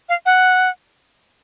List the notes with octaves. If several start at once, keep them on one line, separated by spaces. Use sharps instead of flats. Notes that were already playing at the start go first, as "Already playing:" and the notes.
F5
F#5